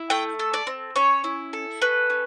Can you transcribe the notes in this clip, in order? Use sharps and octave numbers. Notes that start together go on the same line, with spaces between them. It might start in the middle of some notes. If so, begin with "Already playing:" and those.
Already playing: E4
A3 G5
A4
D5
C4
C#4 C#5
E4
A4
C#4 B4
C#4